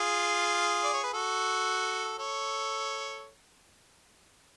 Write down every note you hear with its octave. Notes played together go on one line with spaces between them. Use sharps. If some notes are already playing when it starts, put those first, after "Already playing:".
Already playing: F4 G#4
D5
C#5
B4
F#4 A4
A4 C#5